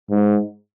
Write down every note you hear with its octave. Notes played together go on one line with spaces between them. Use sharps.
G#2